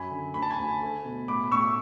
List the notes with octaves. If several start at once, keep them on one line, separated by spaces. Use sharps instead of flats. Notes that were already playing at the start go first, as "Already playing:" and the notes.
Already playing: F#2 G#5 B5
D3
D2 B5
A5
G#5 B5
D2
A3
B2
A2 B5 D6
A2 C#6 E6